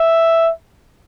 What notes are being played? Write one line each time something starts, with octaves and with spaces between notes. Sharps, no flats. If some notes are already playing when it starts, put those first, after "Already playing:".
Already playing: E5